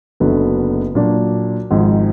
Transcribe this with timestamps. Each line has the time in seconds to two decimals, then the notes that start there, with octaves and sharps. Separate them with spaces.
0.20 F#1 F#2 D3 F#3 B3
0.95 A#2 F#3 D4
1.71 G#1 G#2 F3